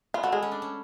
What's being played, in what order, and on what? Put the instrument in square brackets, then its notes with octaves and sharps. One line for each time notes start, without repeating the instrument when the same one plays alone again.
[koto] B3 [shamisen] F4
[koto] A3 [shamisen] F#4
[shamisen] G#3 [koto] B3
[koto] C#4
D4
C#4